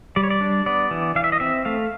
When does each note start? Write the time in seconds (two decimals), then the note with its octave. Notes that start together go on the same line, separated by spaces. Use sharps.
0.16 G3 D5
0.23 C#5
0.30 D5
0.41 D4
0.66 B3 D5
0.91 E3
1.15 E3 F5
1.24 E5
1.32 D#5
1.40 C4 E5
1.65 A3 F5